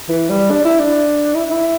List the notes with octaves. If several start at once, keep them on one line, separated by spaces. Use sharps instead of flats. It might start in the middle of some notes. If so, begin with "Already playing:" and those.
E3
G3
D4
E4
D4
E4
E4